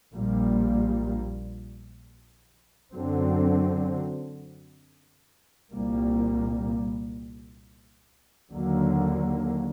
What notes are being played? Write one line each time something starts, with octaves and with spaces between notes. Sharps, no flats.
A#1 A#2 G3 A#3
F#2 D3 F#3 C4
C2 A#2 G3 A#3
D#2 D3 F#3 A#3